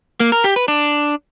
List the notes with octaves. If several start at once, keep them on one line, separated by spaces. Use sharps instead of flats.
A#3
A#4
G4
B4
D4